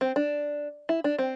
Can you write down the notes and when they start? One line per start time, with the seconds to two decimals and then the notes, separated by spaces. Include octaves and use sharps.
0.01 C4
0.16 D4
0.89 E4
1.04 D4
1.19 C4